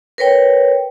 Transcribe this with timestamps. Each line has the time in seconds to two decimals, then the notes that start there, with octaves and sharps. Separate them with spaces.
0.18 A#4 B4 C#5 G5